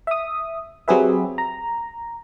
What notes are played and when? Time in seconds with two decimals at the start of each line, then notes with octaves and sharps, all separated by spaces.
0.07 E5 D#6
0.88 F#3 C4 G4 G#4 B4 E5
1.38 A#5